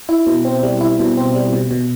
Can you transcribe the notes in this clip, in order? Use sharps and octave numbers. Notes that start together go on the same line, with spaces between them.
E4
B2
C4
G3
E4
B2
C4
G3
B2
B2